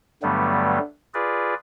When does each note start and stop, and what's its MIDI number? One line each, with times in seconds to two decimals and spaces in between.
0.23 0.79 43
0.23 0.79 50
0.23 0.79 54
0.23 0.79 55
0.23 0.79 57
0.23 0.79 59
1.14 1.55 65
1.14 1.55 68
1.14 1.55 71
1.14 1.55 74